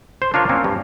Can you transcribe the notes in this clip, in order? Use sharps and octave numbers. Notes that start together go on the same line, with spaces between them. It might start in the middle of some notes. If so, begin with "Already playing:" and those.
C5
D4 F4 A#4 C#5
A#3 C4 C#4
G2